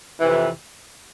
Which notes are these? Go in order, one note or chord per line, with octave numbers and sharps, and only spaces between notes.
F2 C3 E3